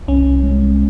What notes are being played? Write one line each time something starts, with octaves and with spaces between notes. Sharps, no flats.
C2 C#4
G#3